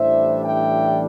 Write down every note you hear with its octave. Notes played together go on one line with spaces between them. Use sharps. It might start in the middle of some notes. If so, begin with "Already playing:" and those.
Already playing: A1 A2 E3 G3 D4 C5 E5
E5 G5